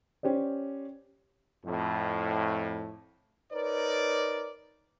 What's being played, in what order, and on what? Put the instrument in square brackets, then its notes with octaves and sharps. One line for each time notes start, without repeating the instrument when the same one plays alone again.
[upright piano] C#4 G4 C5 D5
[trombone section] F2 A2
[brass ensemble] D#4 A#4 B4 C#5 D5